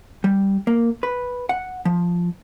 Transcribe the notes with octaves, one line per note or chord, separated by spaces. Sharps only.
G3
A#3
B4
F#5
F3